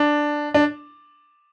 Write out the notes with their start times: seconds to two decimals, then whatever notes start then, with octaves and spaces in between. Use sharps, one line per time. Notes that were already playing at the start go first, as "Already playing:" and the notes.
Already playing: D4
0.54 D4